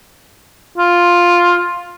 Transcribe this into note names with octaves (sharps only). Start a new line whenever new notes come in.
F4